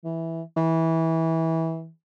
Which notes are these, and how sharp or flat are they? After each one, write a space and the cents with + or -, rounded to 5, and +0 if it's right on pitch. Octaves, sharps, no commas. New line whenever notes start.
E3 -5
E3 -20